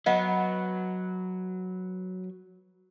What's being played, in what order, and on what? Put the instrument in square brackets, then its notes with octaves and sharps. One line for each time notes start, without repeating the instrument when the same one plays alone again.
[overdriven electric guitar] F#3 [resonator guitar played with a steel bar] B3 [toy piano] D#5 F#5